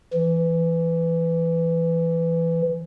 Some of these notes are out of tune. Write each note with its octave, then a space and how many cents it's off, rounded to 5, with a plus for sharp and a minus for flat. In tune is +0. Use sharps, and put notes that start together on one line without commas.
E3 +15